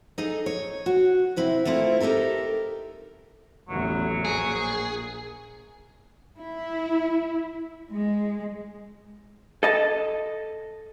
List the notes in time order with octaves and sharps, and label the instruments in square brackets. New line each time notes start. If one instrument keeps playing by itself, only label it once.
[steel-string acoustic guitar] D#4 G#4 A4 D#5
C#5
F#4
C3 C4 E4
A3 A#3 C4 E4 F4
D#4 G4 A4 A#4 E5
[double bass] A1 E2 [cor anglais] F#3
[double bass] A#1 [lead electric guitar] G#4
[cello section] E4
G#3
[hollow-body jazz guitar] A4 D#5 A5